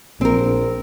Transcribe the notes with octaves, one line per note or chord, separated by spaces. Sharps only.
A#1 C4 A#4